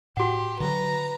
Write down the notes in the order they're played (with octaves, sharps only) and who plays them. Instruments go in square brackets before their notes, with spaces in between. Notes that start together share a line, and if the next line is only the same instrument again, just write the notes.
[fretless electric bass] A2 [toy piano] F#4 F#5 [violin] G4
[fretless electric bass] D3 D#3 F#3 [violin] B4 A#5